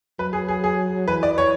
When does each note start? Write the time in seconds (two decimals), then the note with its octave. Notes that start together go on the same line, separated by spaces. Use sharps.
0.19 F#3 B4
0.33 G#4
0.48 G#4
0.64 G#4
1.07 E3 B4
1.23 D5
1.38 C#5